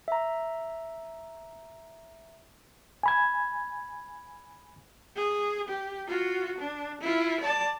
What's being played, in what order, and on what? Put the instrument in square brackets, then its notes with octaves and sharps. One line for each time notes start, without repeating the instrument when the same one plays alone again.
[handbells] E5 A#5
[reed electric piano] G#5 B5 G#6
[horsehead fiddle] G#4
G4
F4 F#4
D4
E4 F4
D5 A5